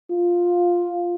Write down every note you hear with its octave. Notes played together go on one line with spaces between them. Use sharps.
F4